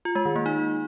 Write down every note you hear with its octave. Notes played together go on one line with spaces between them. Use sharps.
F4
G#3
D#3
A#3
D#4